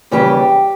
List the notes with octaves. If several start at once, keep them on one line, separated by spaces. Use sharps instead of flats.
D#2 C#3 E3 G3 G4